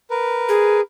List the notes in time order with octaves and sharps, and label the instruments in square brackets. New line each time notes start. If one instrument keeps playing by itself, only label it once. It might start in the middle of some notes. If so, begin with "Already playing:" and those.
[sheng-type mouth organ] A#4 B4
[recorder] G#4